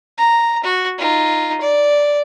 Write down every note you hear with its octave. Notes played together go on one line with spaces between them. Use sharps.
A#5
F#4
D#4 F4
D5